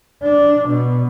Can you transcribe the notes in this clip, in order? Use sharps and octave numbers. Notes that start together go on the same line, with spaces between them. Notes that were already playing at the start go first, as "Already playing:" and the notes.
D4
B2